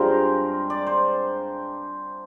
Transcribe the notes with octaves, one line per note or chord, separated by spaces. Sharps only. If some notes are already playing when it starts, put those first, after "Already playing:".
Already playing: G2 F3 G#3 C4 A#4 C5
D5
C5